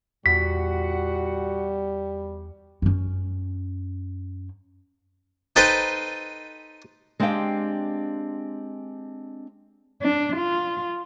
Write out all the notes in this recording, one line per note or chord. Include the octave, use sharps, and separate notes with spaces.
E2 A#2 G3 F#4 F#5 B6
F#2 C#4
D#4 A4 B4 C5 G5 A5
G#3 C4 D4 G4 F5 G5
D4
F4